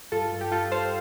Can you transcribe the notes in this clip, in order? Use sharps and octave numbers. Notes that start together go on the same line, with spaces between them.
G2 F4 A4
G2
G4
G2 F4 A4
G2 C5 F5